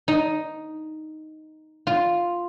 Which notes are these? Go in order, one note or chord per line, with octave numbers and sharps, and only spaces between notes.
D#4
F4